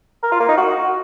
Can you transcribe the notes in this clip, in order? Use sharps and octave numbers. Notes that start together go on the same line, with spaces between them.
A#4
F4
A#3
D#4
F#4